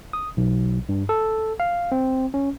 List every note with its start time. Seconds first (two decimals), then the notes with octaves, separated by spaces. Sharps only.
0.13 D#6
0.37 B1
0.89 G2
1.09 A4
1.60 F5
1.92 C4
2.34 C#4